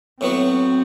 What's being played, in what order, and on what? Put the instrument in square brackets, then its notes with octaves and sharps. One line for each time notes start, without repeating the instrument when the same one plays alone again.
[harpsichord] A2 F#3 B3 F#4 [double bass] C4